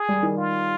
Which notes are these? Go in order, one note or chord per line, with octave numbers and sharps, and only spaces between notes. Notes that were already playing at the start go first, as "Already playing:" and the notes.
Already playing: G#4
G3
D#3
F4